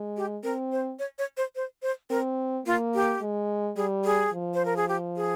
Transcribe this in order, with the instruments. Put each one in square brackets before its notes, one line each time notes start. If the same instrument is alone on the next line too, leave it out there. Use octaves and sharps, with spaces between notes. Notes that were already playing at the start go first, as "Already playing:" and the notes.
Already playing: [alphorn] G#3
[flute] G4
[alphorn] C4 [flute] A#4
[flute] C5
C#5
C#5
C5
C5
C5
[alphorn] C4 [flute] A#4
[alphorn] A#3 [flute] F4
[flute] G4
[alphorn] G#3
[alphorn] G3 [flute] G#4
[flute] G#4
[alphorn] F3
[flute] C5
A#4
G#4
G4
G#4